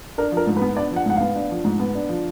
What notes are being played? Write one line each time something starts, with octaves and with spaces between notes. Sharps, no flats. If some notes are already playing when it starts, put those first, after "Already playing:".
D4 A#4
F3 A#4
G#2
B4
B3
D4 D5
F3 F#5
G#2 F#5
B3 F5
D4
F3
G#2
B3
D4
F3